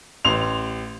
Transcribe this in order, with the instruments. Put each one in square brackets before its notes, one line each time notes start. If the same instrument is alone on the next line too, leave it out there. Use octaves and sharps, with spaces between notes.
[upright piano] A1 C6 F7